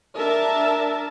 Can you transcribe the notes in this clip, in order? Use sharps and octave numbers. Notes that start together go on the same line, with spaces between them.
D4 A#4 E5 A5